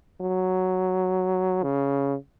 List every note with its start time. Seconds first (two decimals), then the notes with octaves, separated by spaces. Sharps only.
0.21 F#3
1.63 C#3